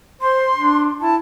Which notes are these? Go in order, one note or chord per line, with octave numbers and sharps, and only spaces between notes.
C5 C6
D4
E4 A5